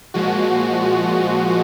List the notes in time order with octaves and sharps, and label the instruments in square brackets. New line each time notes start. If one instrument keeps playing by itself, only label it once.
[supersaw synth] A#2 F3 G#3 F#4